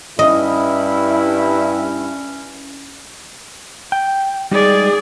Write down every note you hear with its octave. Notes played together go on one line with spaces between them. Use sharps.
G2 C#4 E4 D#5
G5
G3 G#3 D#4 G#4 D5